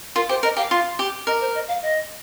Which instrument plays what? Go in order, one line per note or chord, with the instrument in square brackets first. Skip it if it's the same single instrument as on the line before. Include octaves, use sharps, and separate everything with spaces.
[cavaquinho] F4 [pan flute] A#4
[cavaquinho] G4 [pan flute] C5
[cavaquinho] A#4 [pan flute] D#5
[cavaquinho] G4 [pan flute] F5
[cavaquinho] F4
G4
[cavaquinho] A#4 [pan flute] D#5
[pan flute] C5
D#5
F5
D#5